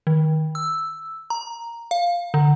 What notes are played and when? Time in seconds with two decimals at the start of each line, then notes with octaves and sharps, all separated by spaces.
0.07 D#3
0.55 E6
1.30 A#5
1.91 F5
2.34 D3